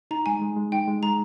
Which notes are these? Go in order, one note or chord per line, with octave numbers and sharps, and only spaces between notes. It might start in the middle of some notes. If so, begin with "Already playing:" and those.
D#4 A#5
G#3 G#5
G#3
G#3
D#4 G5
G#3
G#3 A#5